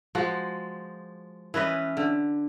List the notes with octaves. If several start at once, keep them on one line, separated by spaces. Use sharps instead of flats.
F3 G#3 F#4
E3 C#4 B4 D#5
D3